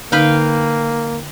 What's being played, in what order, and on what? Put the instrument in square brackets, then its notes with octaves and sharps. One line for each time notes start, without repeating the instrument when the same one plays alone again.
[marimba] D3 D#4 [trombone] A#3 [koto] B4 F5 G5